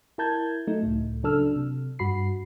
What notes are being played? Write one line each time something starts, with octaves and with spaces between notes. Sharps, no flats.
E4 A#4 A5 G6 G#6
F#3 A3 D#4
C#2 A2
C#3 F#3 D4 A4 E6 F6
C3
G2 F#4 B5 C7